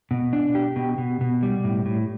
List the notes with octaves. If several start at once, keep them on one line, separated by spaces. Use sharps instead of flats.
B2
D4
G4
B2
B2
B2
G3
A2
A2